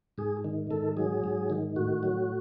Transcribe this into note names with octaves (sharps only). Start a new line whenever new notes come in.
G#2 G#4
D#3
G#2 A4
F#3 G#4
G#2
D#3
A2 F#4
F#3